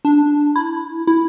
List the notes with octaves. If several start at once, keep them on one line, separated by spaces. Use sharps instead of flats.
D4
E4
E4